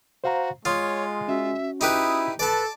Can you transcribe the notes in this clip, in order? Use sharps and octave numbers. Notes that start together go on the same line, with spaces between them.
F#4 C5 F5 A#5
G#3 F4 C#5 C6 D#6 F6
C#4 F#4 E5
D#4 E4 G4 B4 D#6
A4 B4 D5 A5